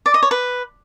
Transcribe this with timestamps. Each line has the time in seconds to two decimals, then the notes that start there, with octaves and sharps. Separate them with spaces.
0.06 D5
0.14 D#5
0.23 C#5
0.31 B4